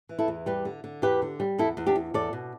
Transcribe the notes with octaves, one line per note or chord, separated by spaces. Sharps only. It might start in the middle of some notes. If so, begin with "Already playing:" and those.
E3
E4 A4
E2
G3 G4 B4
D3
D3
E2 G4 B4
D3
G3
E2 E4 A4
E2
D4 G4
E2
E2 A4 D5
B2